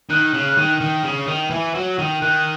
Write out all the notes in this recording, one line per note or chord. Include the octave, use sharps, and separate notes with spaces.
D#3 F#6
C#3
D#3
D#3
C#3
D#3
E3
F#3
D#3
D#3 F#6